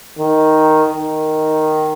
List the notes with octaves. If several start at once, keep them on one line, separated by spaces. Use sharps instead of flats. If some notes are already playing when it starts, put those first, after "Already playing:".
D#3
D#3